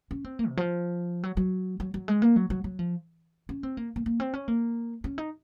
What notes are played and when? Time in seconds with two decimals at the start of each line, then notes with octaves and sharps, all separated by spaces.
0.11 C#4
0.25 C4
0.39 A#3
0.48 C3
0.57 F3
1.23 F#3
1.37 F#3
1.80 F#3
1.94 F#3
2.08 G#3
2.22 A#3
2.36 F#3
2.50 F#3
2.64 F#3
2.79 F3
3.49 C#4
3.63 C4
3.77 A#3
3.96 A#3
4.06 A#3
4.20 C4
4.34 C#4
4.48 A#3
5.04 C#4
5.18 D#4